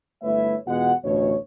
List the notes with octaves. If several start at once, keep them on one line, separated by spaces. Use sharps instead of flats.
G1 A3 E4 B4 C#5 E5
E2 B2 G#3 F4 F#5
A1 D2 B2 C#5